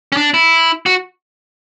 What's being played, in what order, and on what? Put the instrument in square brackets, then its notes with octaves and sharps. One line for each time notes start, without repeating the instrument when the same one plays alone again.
[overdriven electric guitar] C#4
D4
E4
F#4